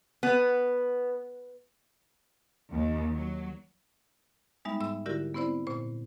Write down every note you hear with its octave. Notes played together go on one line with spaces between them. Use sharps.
B3
D#2
F#3
G3 G#3 B3 D#4 E5
G#2 E5 E6
D3 E4 F#4 G4 A#4 D5
B3 C4 E4 C5 D5
A#2 C5